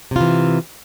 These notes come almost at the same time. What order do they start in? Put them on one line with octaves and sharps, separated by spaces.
C3 F4 E3